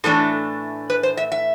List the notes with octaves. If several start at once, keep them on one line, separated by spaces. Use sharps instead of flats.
A2 E3 A3 D4 A4
B4
C5
E5
E5